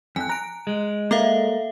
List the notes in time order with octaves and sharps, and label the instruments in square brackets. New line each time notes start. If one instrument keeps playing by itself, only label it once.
[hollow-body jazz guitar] F2 [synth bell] G#5 F#6
[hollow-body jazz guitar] A#5 [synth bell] F#6 D7
[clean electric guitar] G#3
[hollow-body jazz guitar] A#3 [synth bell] A4 E5 F5